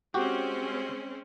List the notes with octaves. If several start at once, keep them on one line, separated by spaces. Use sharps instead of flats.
G#3 C4 C#4 F#4 G4